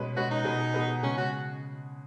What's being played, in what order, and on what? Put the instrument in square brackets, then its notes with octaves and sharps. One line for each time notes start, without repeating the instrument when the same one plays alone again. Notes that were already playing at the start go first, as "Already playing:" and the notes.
Already playing: [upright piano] B2 G#3 C#4 B4
[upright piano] B2 G#3 C#4 B4 [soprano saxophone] F#4
[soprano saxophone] D#4
[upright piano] B2 B3 G#4 B4
B2 B3 G#4 B4
[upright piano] C#3 G#3 B3 G#4 [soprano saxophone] C#4
[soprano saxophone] F#4